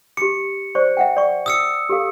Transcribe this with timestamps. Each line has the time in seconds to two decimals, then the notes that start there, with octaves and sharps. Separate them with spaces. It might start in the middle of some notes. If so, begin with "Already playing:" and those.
0.17 G4 D6 C#7
0.75 C5 D5 C#6
0.97 E5 F#5 G5
1.17 D5 C#6
1.46 D#6 E6 C#7
1.89 G4 A4 F5